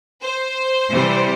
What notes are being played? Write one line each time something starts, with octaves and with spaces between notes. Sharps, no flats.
C5
C3 E3 G3